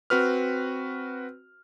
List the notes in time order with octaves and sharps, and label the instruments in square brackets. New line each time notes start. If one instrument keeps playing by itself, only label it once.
[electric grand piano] C4 F#4 B4 F6